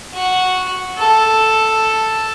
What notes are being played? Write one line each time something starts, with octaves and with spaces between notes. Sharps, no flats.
F#4
A4